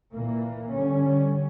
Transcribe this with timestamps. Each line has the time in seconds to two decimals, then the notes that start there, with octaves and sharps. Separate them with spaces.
0.12 A#2 E3 A#3
0.71 D3 G3 C#4